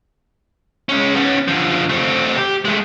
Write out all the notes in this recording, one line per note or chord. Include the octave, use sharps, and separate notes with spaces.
G#3 C#4
B3 C#4
D3 F3
A3 C4
G4
G#3 A3